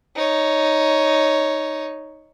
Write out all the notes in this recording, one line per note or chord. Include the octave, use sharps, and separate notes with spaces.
D#4 C#5